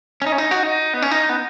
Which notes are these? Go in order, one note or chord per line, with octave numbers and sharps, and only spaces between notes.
C#4
D#4
C#4
D#4
F#4
D#4
B3
C#4
D#4
B3